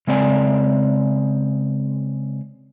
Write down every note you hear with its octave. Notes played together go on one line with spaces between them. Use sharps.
C#3 G#3 C4 D5 G#5